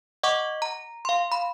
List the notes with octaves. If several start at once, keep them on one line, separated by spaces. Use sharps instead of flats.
D#5 F#5 C#6 D6
A#5
F5 C6
B5